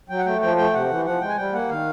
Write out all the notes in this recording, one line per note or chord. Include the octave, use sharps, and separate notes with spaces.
F#3 G5
F#5
A3 G5
F3 G5
A3 G5
C3 F#5
E3
F3 F#5
G#3 G5
G#5
G3 G5
A#3 F#5
D#3 F5